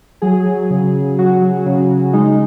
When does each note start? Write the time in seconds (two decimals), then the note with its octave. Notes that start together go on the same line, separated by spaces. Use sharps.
0.22 F#3 G#4
0.46 F#3
0.70 C#3
0.94 C#3
1.19 F#3 F#4
1.42 F#3
1.66 C#3
1.90 C#3
2.13 G#3 D#4